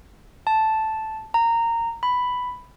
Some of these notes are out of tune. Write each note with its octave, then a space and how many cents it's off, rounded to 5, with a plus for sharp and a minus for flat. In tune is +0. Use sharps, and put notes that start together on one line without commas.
A5 -5
A#5 -15
B5 +5